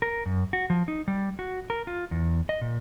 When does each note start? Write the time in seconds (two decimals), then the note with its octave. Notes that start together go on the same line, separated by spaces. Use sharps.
0.02 A#4
0.26 F#2
0.53 F#4
0.70 F3
0.88 D#4
1.08 G3
1.39 F#4
1.70 A#4
1.87 F4
2.11 E2
2.49 D#5
2.61 A#2